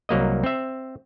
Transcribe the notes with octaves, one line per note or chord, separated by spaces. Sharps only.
C2 F#3 A#3 D#5
C4 E5